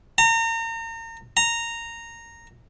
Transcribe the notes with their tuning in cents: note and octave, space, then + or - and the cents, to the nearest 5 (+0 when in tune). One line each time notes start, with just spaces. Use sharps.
A#5 -35
A#5 -10